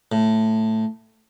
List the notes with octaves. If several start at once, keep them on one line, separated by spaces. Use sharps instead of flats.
A2